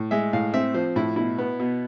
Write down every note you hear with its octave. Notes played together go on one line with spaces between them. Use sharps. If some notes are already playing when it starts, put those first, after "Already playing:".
Already playing: A2
G#3 E5
A2 F5
C4 E5
F3 C5
A2 E4
B2 E4
B3
B2